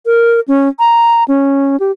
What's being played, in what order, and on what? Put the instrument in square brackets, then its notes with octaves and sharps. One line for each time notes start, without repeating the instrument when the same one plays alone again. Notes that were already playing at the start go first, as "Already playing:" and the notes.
[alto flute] A#4
C#4
A#5
C#4
G4